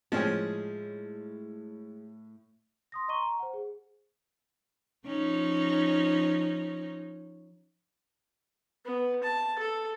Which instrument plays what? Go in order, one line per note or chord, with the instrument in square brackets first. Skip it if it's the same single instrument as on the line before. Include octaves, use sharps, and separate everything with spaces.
[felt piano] A2 [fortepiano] F3 C#4 G#4 [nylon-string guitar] G#3
[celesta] C6 D#6 A#6
D#5 A#5 C6 C#6 D#7 G7
A#5
C5 F#5
G#4
[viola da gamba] F3 C#4 D#4
[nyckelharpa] B3
A5
A4